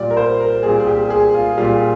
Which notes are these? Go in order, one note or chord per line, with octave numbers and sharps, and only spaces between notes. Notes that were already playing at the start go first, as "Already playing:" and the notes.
Already playing: A#2 G3 D5
A#4
C5
A#4
A#2 G3 G#4
G#4
G4
G#4
F4
A#2 G3 F4